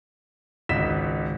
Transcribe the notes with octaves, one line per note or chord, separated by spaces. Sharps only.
G#1 C#2 D#5 B6 E7